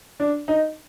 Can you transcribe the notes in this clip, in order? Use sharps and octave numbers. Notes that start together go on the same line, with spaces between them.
D4
D#4